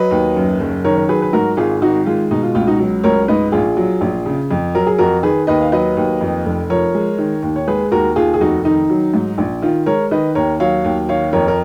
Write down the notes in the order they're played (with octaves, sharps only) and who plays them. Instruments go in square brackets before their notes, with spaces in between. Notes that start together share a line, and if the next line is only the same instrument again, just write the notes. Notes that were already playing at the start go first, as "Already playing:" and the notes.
Already playing: [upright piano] F#3 B4 D#5
D#2
F#2
F#1
D#3 A#4 C#5
C#5
F#3 G#4 B4
B4
G#2 F#4 A#4
G#1 F4 G#4
D#3 D#4 F#4
G#3 F4
B2 D#4
F4
C#2 F4
D#4 F#4
F#3
C#2 A#4 C#5
G#2 B4 D#5
A#1 F4 G#4
F#3
A#1
C#3
F2
F#3 A#4
G#4
F2 F#4 A#4
D#3 G#4 B4
D#2 B4 D#5
F5
F#3 B4 D#5
D#2
F2
F1
F3 A#4 C#5
G#3
D#3
D#2
C#5
G#3 G#4 B4
D#2 F#4 A#4
D#2 F4 G#4
G#4
F1 D#4 F#4
D#3 D#4
F#3
G#2
A#1
D#3 F4
G#3 A#4 C#5
D#3 B4 D#5
D#2 A#4 C#5
F#3 C#5 F5
D#2
D#3 C#5 F5
F2 A#4 C#5
A#4